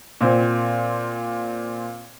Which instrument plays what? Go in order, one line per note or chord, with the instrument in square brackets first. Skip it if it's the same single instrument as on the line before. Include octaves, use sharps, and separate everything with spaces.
[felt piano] A#2 C4